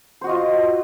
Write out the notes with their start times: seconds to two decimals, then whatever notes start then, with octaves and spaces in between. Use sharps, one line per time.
0.21 C5
0.24 F#4
0.27 D#5
0.29 F4